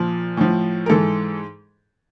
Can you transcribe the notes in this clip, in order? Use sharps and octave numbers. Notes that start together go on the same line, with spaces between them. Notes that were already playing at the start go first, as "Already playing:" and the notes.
Already playing: A#2 F3
A2 F3
A#4
G#2 E3 A4